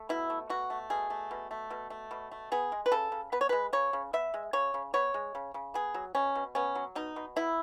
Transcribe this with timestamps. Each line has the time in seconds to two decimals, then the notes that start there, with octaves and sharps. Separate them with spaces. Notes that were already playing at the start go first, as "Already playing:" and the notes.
Already playing: A3
0.09 B2 E4
0.30 A3
0.49 B2 F#4
0.70 A3
0.90 B2 G#4
1.10 A3
1.31 B2
1.51 A3
1.70 B2
1.90 A3
2.11 B2
2.32 A3
2.52 B3 G#4
2.72 G#3
2.86 B4
2.92 C#3 A4
3.12 C#3
3.32 B3 B4
3.41 C#5
3.49 G#3 B4
3.73 C#3 C#5
3.93 C#3
4.13 B3 E5
4.34 G#3
4.53 C#3 C#5
4.74 C#3
4.94 B3 C#5
5.14 G#3
5.35 C#3
5.54 C#3
5.74 B3 G#4
5.94 F#3
6.15 B2 C#4
6.35 B2
6.55 B3 C#4
6.75 F#3
6.95 B2 D#4
7.16 B2
7.36 B3 E4